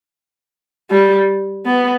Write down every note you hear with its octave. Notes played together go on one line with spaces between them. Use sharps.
G3
B3